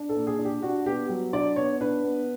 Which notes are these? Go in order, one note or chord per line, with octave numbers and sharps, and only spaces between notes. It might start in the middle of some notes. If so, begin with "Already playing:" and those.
Already playing: D4
A4
A#2
G#4
D4
G4
D4 F#4
B3 G4
F#3
D4 D5
B3 C#5
D4 B4
B3